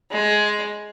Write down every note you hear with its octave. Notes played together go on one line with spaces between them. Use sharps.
G#3